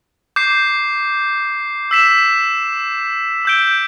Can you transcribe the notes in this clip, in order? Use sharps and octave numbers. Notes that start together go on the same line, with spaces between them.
D6 G6 C7
E6 B6 E7
E6 G6 D7 G7